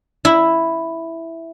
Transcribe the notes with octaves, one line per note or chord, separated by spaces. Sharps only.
E4